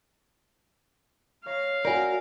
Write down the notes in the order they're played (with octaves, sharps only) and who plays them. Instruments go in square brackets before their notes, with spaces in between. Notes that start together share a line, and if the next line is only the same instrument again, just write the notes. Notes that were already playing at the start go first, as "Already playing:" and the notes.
[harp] C#5 A#5 [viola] F5
[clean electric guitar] F#4 A#4 [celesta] D5 G#5 [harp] A#6